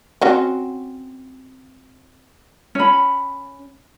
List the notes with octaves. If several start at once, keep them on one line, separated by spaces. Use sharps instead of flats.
C4 C#4 F#4
C#4 B5